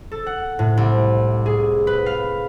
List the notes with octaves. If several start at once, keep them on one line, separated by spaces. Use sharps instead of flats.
A4
F#5
A2
C2
G#4
B4
F5